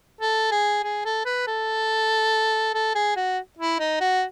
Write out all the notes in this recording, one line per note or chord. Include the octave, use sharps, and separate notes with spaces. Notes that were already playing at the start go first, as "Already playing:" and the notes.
A4
G#4
G#4
A4
B4
A4
A4
G#4
F#4
E4
D#4
F#4